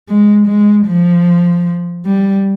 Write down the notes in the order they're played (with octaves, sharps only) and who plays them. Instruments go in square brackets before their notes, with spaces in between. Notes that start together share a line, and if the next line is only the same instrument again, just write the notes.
[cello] G#3
G#3
F3
G3